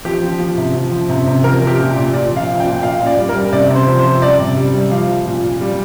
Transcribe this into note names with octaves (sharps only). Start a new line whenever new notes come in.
F3 G4
F3
F3
C3
F3
F3
C3
C3
F3 A#4
F3
G4
A#2
A#2
A#2 D5
F3
F5
F3
G5
A#2
A#2 F5
A#2
D5
G3
A#4
G3
C3 D5
C3
C5
F3
C5
F3
G3 D5
C3
G3
G3
F3 F5
F3
A#2
A#2
G3